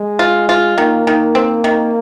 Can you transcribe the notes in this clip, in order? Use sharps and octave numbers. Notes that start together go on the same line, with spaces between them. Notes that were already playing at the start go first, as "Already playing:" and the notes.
Already playing: G#3
F4
F4
D#3 A#3
D#3
C4
D#3